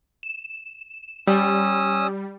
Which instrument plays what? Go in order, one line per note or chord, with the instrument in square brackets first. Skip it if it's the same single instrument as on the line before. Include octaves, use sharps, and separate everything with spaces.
[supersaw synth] E7
[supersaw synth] G3 [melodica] C#4 D#6 E6